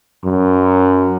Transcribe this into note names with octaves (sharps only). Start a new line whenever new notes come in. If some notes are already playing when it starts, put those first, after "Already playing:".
F#2